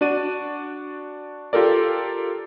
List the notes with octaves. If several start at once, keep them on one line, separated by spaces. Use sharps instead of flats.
D4 F#4 D5 D#7
F4 G4 A4 A#4 D5